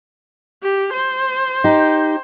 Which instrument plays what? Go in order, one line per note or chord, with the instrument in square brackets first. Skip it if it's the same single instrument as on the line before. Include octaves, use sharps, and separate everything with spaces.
[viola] G4
C5
[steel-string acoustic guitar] D#4 G4